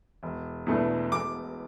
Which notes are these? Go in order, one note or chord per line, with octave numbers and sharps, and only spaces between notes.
E1
E2 B2 A3 D4
E1 D6